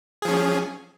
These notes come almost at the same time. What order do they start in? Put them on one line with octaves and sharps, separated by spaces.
G#4 F3 C#4